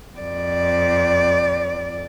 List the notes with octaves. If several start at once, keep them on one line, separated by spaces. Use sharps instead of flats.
F2 D5